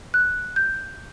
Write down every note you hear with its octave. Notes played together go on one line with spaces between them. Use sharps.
F#6
G6